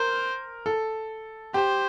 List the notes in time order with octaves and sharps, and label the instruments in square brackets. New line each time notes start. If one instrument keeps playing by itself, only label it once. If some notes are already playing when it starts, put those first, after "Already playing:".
Already playing: [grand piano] A#4 [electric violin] C5
[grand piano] A4
[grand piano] G4 [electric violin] C5